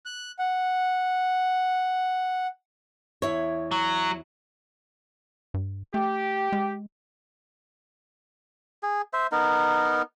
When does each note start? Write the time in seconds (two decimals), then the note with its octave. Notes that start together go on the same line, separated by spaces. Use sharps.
0.05 F#6
0.39 F#5
3.22 E2 E4 C#5
3.71 F#3
5.54 G2
5.94 A3 G4
6.52 G#3
8.83 G#4
9.13 C5 E5
9.32 B3 D#4 A#4